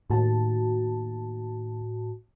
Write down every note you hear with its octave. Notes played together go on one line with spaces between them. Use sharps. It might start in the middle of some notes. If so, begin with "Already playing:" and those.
D#2 A2 F#4 A5